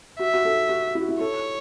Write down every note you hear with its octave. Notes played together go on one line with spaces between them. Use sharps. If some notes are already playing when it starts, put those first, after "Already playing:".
F#4 E5
F#4
A4
F#4
E4
F#4
E4
A4 C#5